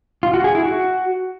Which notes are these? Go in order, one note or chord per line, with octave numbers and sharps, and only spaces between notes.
F4
F#4
G#4
E4
F#4